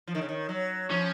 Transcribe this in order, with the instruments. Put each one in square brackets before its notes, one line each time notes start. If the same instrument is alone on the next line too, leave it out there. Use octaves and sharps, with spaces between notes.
[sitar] F3
D#3
C#3
D#3
F#3
[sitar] F3 [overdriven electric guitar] C#4